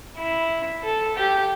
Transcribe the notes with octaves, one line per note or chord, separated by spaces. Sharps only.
E4
A4
G4